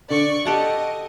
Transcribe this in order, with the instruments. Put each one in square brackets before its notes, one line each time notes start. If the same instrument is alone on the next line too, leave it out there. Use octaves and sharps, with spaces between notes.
[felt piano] D3 [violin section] D5 C#6
[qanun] G4 A4 F#5 [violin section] D#5